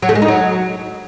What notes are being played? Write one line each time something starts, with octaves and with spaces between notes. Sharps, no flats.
F#3
A3
G#3
D#4
F#3